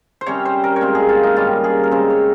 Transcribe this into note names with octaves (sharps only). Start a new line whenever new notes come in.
C5
C3 G3 C#4 C#5
C5
A#4
C#5
A#2 G#3 C4 C5
G#4
F4
D#4
G2 D#3 G3 C#4 F4
G#4
A#4
C#3 G#3 C4 C5
C#5